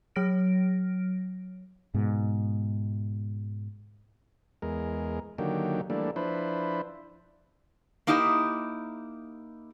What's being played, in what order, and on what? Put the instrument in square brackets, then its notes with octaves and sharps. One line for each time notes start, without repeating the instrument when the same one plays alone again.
[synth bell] F#3 C#5 F6 A#6 D7
[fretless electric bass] G#2 B2
[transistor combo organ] E2 G#3 A#4
D3 D#3 F#3 A#3 G4
E3 G3 A3 A#3 D4
F3 D4 E4 B4 C5
[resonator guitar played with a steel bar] A#3 D#4 E4 G4 D#5 E5